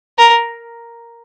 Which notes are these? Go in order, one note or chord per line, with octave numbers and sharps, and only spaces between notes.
A#4